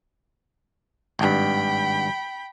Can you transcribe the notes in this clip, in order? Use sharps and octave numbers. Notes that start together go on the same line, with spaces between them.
G#1 G2 G5 B5